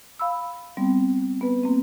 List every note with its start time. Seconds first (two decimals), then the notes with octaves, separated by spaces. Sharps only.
0.19 F5 B5 E6
0.77 G3 B3 C4
1.41 B3 B4
1.64 A#3 C4